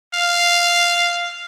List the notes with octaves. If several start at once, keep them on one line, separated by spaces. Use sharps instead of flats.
F5